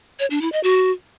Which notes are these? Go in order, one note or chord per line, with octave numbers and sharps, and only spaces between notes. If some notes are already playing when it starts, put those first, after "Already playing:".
C#5
D4
E4
D#5
F#4